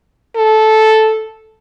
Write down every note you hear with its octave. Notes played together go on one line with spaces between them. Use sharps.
A4